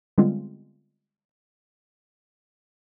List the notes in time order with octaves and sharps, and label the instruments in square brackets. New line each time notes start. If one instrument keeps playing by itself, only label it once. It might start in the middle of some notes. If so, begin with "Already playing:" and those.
[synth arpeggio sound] D3 G3 G#3 B3 C4 F4